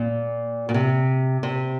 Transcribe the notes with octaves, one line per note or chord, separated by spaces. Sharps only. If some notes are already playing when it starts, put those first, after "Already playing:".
Already playing: A#2
A#2
C3
C3